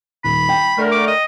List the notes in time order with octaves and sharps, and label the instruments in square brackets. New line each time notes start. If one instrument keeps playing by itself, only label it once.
[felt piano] D#1 [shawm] B5
[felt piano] G5
[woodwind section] D3 A3 A#4
[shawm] D6
D#5